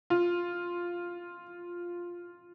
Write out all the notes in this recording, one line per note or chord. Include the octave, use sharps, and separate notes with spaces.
F4